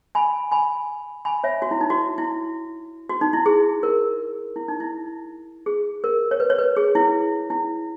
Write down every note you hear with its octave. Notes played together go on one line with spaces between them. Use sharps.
G#5 B5
G#5 B5
G#5 B5
C#5 E5
F#4
E4
D#4
F#4
E4
F#4
D#4
E4
G#4
A#4
E4
D#4
E4
G#4
A#4
C#5
B4
C#5
B4
G#4
E4
E4